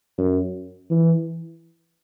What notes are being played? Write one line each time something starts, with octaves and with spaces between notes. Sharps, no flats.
F#2
E3